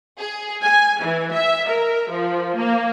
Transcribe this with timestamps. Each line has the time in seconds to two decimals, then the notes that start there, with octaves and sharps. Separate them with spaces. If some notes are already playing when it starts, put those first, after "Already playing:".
0.18 G#4
0.63 G#5
1.02 E3
1.32 E5
1.67 A#4
2.10 F3
2.56 A#3